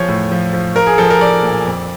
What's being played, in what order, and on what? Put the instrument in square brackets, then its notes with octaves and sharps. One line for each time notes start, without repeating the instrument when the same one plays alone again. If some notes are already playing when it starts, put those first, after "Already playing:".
Already playing: [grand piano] E2 F3 C#5
A2
F3
F3
F3 A#4
G#4
F3 A4
A#4
F3 D5
A#2
F2